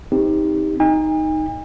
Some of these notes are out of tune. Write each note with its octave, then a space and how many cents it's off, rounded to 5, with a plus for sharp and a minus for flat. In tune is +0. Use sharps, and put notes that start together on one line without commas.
C4 +0 D#4 +15 G4 +20
D#4 +0 G#5 -45